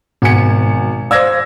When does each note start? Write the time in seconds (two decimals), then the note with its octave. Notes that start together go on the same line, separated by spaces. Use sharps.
0.22 G#1 G#2 B2 F#4 G#5 C#7
1.11 C5 D5 F5 E6 G#6 A#6